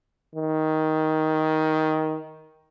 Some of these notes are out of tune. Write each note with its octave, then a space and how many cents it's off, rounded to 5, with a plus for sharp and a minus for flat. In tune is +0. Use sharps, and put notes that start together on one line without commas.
D#3 +10